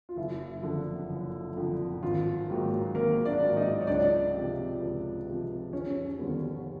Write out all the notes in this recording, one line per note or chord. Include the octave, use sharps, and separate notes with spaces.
F4
F#1 E4
F2 D3 F3
F#1
F2 D3 F3
G#1 F4
G#2 D#3 F#3 A#3
G#1 A#3 A#4
D4 D5
G#2 D#3 F#3 A#3
D#4 D#5
C#5
C#2 D4 D5
C3 F3
C#2
C3 F3
F1 C#4 C#5
D#2 D3 G3 B3